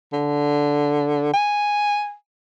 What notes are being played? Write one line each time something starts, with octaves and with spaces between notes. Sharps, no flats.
D3
G#5